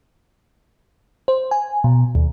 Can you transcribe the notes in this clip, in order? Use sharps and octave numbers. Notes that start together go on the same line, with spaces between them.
C5
G#5
B2
D#2